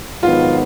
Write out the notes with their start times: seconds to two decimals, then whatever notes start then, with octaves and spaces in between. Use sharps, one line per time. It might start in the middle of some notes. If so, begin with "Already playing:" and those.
0.23 G#2 D#3 F#3 B3 F4